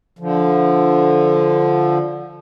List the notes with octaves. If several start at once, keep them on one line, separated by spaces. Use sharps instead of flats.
D3 F3